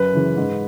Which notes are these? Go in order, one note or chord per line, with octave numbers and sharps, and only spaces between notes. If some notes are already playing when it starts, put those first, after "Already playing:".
Already playing: F#2 B4
C#3 E3
G#2